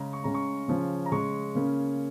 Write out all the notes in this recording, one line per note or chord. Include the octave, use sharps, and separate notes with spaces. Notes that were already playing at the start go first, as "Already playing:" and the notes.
Already playing: C#3 G#3 C#4 A#5
C#6
C#3 G#3 C#4 A#5
C#6
C#3 F3 C#4
A#5
C#3 G#3 C#4 C#6
C#3 A#3 C#4